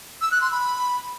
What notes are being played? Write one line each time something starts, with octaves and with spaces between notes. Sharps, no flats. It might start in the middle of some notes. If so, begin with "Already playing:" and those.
E6
F#6
C6
B5